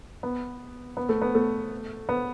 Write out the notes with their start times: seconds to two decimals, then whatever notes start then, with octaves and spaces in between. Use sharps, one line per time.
0.23 B3
0.97 B3
1.09 A3
1.22 B3
1.35 A3
2.09 B3